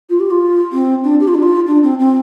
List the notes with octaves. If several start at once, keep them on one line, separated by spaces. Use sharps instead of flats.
F4
G4
F4
C4
D4
G4
F4
D4
F4
D4
C4
C4